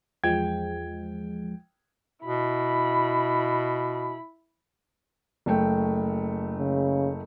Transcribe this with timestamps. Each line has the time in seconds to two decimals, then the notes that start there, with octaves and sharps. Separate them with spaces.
0.24 E2 F3 G#3 G5 G#6
2.24 B2 E4 B5
5.46 F#1 A3 G5
6.59 C#3